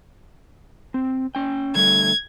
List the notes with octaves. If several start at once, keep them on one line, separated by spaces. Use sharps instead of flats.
C4
C#4 G5
D3 G3 A3 G#6